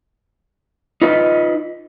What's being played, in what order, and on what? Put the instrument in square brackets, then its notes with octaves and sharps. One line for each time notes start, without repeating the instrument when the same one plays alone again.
[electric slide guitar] D#4 F4 B4 D#5